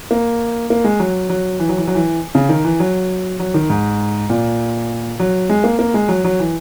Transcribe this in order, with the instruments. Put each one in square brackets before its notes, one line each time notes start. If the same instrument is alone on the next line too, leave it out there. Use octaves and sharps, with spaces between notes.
[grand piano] A#3
A#3
G#3
F#3
F#3
E3
F#3
E3
F#3
E3
C#3
D#3
E3
F#3
F#3
D#3
G#2
A#2
F#3
G#3
A#3
A#3
G#3
F#3
F#3
E3